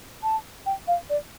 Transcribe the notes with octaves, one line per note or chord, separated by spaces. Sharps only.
A5
G5
F5
D5